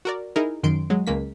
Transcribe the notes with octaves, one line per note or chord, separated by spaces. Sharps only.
F#4 A#4 D5
D#4 E4 G#4 A#4
F#2 D#3 C6 D7
F#3 G#3
C#2 G#3 A#3 B6